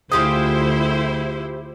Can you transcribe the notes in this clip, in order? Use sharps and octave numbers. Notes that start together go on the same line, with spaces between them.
D2 E4 F4 G4 G#4 C5 D#6